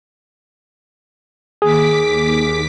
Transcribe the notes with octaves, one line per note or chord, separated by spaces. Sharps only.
D#2 G#4 D6 B6